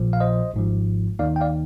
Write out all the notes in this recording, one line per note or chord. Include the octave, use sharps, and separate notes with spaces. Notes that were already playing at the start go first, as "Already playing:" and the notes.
Already playing: A#1 A#2 F3
F5
C5 D#5
G#1 G#2 F3
D#2 D#3 A#3 D#4 D5 F5
G5
D5 F5